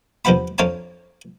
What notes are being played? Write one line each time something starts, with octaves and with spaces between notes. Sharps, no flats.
E2 G2 F3 B4 F#5 B5
F2 D4 C#5 F5 G#5 A#5